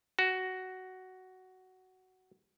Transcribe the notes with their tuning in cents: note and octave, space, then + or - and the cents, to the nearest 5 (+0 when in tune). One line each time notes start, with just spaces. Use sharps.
F#4 +10